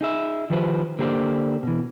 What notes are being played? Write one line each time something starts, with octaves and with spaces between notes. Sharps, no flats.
D#4 G#4 E5
D#3 F3 G4 G#4 B4 C5
D3 A#3 G4 G#4 C5 D5
B2 E3